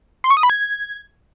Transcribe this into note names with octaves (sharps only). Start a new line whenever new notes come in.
C6
C#6
D#6
B5
G#6